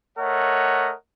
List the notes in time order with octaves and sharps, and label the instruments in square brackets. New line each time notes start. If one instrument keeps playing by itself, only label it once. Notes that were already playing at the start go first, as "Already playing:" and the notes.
[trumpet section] A3 A#4 C#5 D#5 F#5